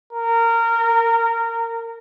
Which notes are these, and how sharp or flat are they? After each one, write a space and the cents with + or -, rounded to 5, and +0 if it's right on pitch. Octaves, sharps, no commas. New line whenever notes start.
A#4 -20